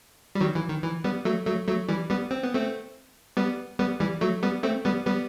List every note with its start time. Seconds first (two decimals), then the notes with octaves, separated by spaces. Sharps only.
0.35 G3
0.40 D#3 F#3
0.55 E3
0.69 D#3
0.83 E3
1.04 G3 B3
1.25 F#3 A3
1.47 F#3 A3
1.67 F#3 A3
1.89 E3 G3
2.10 G3 B3
2.31 C4
2.43 B3
2.54 A3 C4
3.37 G3 B3
3.79 G3 B3
4.00 E3 G3
4.21 F#3 A3
4.43 G3 B3
4.63 A3 C4
4.85 G3 B3
5.06 G3 B3